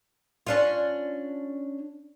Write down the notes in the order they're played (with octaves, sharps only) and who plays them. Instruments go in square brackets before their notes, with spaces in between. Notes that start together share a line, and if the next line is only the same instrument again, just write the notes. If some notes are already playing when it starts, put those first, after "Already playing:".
[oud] C#4 D4 F4